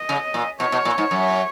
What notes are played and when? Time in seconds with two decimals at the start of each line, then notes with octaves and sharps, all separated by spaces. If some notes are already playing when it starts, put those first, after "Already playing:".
Already playing: D#5
0.09 C#3
0.34 A#2
0.60 B2 C#5
0.72 B2
0.85 A#2
0.98 G#2
1.11 F#2